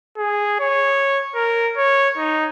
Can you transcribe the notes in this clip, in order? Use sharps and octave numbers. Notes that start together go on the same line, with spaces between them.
G#4
C#5
A#4
C#5
D#4